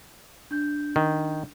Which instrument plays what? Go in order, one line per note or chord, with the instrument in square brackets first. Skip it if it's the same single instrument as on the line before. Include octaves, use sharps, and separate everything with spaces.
[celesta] D4 G6
[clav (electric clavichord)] D#3